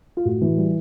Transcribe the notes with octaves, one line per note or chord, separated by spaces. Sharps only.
F4
A2 F#4
E3
G3